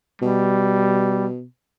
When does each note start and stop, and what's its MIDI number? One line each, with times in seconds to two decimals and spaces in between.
0.22 1.44 47
0.22 1.28 55